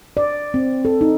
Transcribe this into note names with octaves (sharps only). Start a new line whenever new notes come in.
D5
C4
A4
D#4